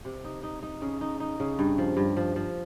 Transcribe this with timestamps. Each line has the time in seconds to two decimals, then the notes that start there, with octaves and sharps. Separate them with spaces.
0.05 C3
0.24 D#4
0.43 D#4
0.63 D#4
0.82 C#3
1.01 D#4
1.20 D#4
1.40 C#3
1.59 G2
1.78 F3
1.97 G2
2.17 F3
2.36 F3